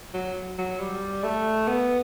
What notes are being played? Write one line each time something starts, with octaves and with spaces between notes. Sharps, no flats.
F#3
F#3
G3
A3
B3